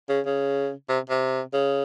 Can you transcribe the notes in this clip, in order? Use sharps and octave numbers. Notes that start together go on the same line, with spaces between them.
C#3
C#3
C3
C3
C#3